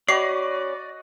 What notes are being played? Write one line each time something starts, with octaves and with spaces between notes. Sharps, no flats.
C#4 F#4 D5 D#5 B5 C7